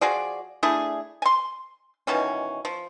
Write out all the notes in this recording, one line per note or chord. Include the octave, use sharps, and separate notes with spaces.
F3 F#4 G#4 D5
A3 D4 E4 G#4
G#5 C6
B2 D#3 E3 C#4
F3